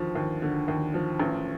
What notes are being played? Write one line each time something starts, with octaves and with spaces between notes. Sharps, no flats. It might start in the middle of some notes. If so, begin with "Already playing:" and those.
Already playing: D#2 D3 F3
D#2
D3
D#2
F3
A1